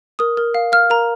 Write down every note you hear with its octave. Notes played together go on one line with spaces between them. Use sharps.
A#4 D#6
A#4
F5
F5 F6
A#4 A#5